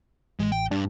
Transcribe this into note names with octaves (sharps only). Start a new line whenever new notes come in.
A1 G#3
G5
G2 D4